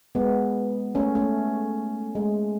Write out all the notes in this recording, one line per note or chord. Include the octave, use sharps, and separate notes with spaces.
G#3 B3
A3 C#4
A3 C#4
G#3